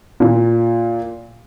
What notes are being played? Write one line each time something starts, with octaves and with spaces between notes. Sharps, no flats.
A#2